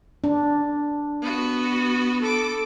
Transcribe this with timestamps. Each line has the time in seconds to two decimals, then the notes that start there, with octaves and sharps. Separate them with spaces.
0.24 D4
1.22 B3 F#4
2.21 A4 D6